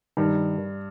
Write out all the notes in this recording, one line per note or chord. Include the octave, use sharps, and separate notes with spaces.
G2 D#3